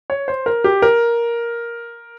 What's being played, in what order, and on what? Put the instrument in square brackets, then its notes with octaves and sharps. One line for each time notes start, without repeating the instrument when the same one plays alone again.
[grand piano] C#5
C5
A#4
G4
A#4